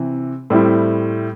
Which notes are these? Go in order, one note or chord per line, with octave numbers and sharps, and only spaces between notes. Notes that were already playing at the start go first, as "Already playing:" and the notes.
Already playing: C3 E3
A2 G3 C4 E4